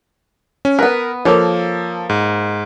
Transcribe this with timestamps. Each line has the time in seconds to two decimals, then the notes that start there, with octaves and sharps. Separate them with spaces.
0.65 C#4
0.79 B3 A#4 B4
1.25 F3 A#3 A4 C#5
2.10 G#2